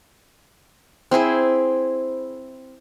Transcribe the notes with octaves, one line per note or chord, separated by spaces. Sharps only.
C4 E4 G#4 C5